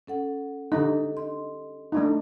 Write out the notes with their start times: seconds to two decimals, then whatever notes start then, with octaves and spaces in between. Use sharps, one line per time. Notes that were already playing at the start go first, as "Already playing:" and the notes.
0.07 C#4 A4 F#5
0.72 D3 D#4 G4 A4
1.17 D#5 C6
1.92 A3 D4 D#4